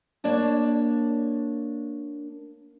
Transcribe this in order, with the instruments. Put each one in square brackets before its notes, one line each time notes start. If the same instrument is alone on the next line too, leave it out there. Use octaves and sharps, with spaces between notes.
[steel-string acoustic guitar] A#3 D4 C#5 D5 A5